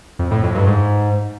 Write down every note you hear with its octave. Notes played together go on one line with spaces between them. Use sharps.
F2
A2
F2
G2
G#2